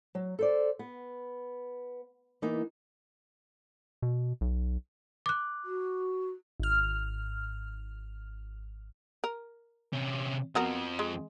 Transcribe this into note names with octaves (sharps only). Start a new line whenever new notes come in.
F#3
A4 C5 D5
B3
E3 A#3 B3 D#4
B2
B1
D6 F#6
F#4
G#1 F6
A#4
C3 C#4
F2 B3 F#4 A#4
G#3